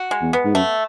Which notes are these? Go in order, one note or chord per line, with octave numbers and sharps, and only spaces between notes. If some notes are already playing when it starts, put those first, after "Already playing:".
Already playing: F#4
G#3
E2
B3
G#2
F#2 A3